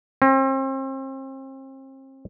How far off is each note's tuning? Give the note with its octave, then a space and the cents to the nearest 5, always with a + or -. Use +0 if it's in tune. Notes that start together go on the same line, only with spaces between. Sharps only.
C4 +40